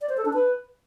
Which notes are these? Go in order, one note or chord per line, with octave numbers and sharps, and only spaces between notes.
D5
C5
A4
D4
B4